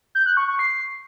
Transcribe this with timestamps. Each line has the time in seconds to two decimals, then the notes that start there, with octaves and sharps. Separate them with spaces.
0.15 G6
0.26 F#6
0.37 C#6
0.48 C#6
0.59 C7